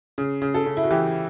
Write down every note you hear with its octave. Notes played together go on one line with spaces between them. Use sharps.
C#3
C#3
A4
C#3
E4
F#4
E3 G4